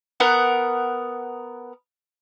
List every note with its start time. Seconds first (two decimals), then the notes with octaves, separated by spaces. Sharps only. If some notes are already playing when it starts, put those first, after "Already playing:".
0.20 B3 A#4 F#5